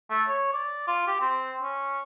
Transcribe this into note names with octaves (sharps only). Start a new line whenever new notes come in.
A3
C#5
D5
F4
G4
C4
C#4